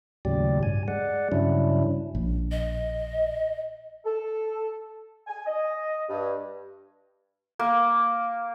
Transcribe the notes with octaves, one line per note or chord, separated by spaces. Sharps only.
D#2 A2 C#3 F#3 G4 D5
G2 G#5
G#3 D5 F#5
G2 C#3 F#3 C#4 D4 E4
A#1
D#5
A4
G#5
D#5
G2
A#3